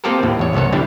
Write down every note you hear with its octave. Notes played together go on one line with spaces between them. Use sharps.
A#3 C4 F4 G4 A4 A#4
D#2 A2
E2 C#5
G1 C2 B3 A4 C#5
D3 E3 G3 D4 E4 G4